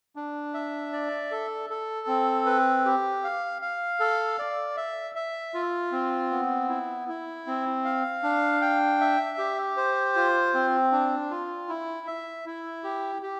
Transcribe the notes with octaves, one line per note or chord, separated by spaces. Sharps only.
D4
E5
D5
A4
A4
C4
B4
G4
F5
F5
A4
D5
E5
E5
F4
C4
B3
E4
E4
C4
F5
D4
G5
E5
G4
C5
F4
C4
D4
F4
E4
E5
E4
G4
G4